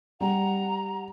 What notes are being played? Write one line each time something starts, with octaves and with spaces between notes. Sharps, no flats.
G3 F#5 A#5